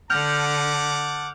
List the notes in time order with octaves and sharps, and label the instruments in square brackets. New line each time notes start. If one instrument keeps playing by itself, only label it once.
[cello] D3 [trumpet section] F#5 A5 D6 [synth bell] F6 G6 F7